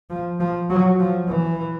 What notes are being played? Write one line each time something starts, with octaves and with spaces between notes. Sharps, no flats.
F3
F3
F#3
F3
E3